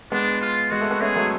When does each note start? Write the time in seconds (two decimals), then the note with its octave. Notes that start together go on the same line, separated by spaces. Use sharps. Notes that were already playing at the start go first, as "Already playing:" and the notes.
0.12 G#3 B3 D4
0.41 F4
0.71 G#3 F#4
0.81 A3
0.91 B3
1.01 A3 C#4 G#4
1.16 F#3 A3